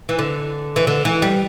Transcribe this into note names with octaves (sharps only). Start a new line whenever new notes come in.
E3
D3
E3
D3
E3
G3